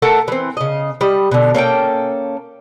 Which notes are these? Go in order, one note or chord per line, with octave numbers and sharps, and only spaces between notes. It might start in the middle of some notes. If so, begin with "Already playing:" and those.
A3 A4 A#4 F#5
E3 C4
C#3 D#5
G3 D#5
B2 D3
A#3 C#4 A4 G5